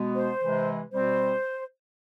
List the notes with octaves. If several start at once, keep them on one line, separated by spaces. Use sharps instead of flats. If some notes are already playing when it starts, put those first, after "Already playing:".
Already playing: B2 G#3 B3
C5
C3 E3 G#3
B2 G3 C4 C5